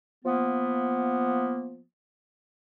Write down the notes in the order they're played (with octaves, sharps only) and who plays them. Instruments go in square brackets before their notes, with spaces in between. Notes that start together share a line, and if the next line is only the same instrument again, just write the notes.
[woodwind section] F3 A#3 B3